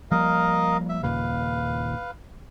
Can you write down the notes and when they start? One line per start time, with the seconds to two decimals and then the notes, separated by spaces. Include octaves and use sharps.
0.11 F3 G3 A#3 A#4 D#5 F5
0.89 E5
1.03 D#2 A#2 C#3 B4 F5